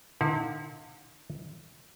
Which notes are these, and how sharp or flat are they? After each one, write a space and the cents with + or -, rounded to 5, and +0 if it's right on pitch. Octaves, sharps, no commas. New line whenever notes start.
D3 +40 E4 -40 F5 +40